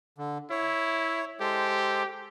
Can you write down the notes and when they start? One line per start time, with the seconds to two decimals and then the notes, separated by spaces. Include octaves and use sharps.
0.18 D3
0.50 E4 C#5
1.40 G#3 G4 A4 C5